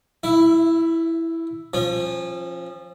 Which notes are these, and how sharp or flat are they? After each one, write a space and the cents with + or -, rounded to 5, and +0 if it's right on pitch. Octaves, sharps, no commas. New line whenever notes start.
E4 +0 E5 +30
F3 +0 C#4 -35